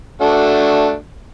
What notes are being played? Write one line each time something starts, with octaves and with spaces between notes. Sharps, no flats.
A3 D4 F#4